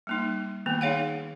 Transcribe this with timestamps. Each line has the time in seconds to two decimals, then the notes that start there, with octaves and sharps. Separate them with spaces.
0.07 G3 A#3 D#4
0.66 D#3 A#3 B3
0.81 D#4 G#4 C#5 F5 F#5